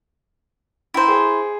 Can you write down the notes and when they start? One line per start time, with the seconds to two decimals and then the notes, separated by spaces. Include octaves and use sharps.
0.94 E4 C5 G5 A#5
1.08 G#4